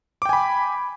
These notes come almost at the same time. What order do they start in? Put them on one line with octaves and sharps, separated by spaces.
D6 G5 G#5 B5